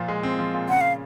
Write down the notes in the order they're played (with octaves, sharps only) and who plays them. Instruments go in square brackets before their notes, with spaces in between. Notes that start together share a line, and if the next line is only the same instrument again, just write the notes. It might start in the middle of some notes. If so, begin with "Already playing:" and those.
Already playing: [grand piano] A#2 F3
G#3
C4
F3
A#2
[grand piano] C#3 [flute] F#5
[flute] F5